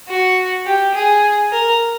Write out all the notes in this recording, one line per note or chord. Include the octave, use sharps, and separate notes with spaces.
F#4
G4
G#4
A#4